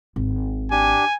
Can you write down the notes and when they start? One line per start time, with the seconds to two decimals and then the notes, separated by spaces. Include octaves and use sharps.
0.16 G#1
0.71 D4 G4 G#5